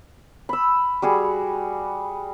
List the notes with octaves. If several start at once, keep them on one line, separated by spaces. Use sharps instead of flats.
B5 E6
G3 F#4 G#4